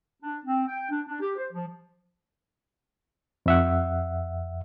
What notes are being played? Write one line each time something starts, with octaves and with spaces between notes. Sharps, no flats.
D4
C4
G5
D4
D4
G4
C5
F3
F2 E5 F#5